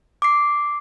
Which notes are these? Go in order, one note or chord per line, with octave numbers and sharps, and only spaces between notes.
D6 C7